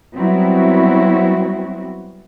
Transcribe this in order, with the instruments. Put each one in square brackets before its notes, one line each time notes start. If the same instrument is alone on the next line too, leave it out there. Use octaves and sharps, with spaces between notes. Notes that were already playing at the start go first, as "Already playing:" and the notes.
[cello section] F#3 G3 B3 C4 E4 F#4